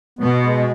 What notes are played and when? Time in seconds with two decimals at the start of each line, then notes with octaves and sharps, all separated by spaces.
0.19 B2 B3
0.42 G#3